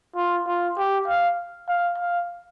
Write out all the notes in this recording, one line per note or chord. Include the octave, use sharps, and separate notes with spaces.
F4
F4
G4
F5
F5
F5